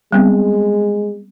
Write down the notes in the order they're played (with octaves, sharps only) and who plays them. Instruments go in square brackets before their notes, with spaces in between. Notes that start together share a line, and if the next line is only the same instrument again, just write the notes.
[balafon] G3 B3 C4 [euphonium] G#3